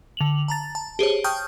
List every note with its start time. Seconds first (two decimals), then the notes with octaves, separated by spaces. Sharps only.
0.17 D3 F7 F#7
0.48 A5 A#5 A6
0.75 A5
0.99 G4 G#4 C5 C#5
1.24 G5 A5 C#6 D#6 F6 G6